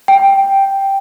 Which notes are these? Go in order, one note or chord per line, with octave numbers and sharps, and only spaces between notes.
G5